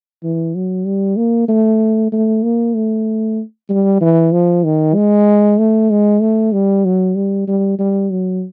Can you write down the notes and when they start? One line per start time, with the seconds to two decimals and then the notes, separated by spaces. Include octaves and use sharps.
0.23 E3
0.55 F#3
0.86 G3
1.17 A#3
1.49 A3
2.13 A3
2.43 A#3
2.75 A3
3.69 G3
4.01 E3
4.33 F3
4.65 D#3
4.95 G#3
5.58 A3
5.91 G#3
6.22 A3
6.53 G3
6.85 F#3
7.16 G3
7.48 G3
7.79 G3
8.11 F#3